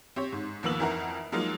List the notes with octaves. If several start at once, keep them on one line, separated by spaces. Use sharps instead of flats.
C4 G4 C#5
G#2
D#2 F3 A#3 B3 E6 F#7
F2 E3 A#4 F#5 A#5
F3 F#3 G#3 A#3 D#4 F4